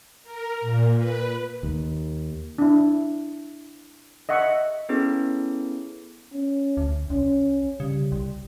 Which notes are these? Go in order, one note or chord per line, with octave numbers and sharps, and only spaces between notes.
A#4
A#2
B4
D#2
D4 E4
D#5 E5 F#5 C#6 D#6
B3 C#4 E4 G#4 A4 B4
C#4
D2
C2 C#4
C#3 G3
C2